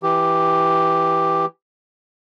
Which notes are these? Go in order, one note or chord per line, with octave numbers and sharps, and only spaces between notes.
E3 G4